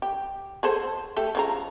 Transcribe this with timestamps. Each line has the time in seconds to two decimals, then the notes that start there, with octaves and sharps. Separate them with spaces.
0.02 G4
0.63 G#4 A4 C5
1.16 A3 G4 A4
1.35 C#3 F3 A#5